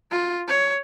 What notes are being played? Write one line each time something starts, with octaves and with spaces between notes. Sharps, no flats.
F4
C#5